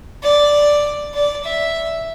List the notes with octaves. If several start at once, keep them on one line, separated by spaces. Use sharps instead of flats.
D5
D5
E5